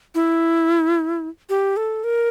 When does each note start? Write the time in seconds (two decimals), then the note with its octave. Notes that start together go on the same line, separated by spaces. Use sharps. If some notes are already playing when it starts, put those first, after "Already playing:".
0.15 E4
1.50 G4
1.77 A4
2.04 A#4